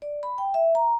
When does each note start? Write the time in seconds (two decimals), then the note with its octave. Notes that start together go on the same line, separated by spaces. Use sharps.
0.02 D5
0.23 B5
0.38 G5
0.54 E5
0.75 A#5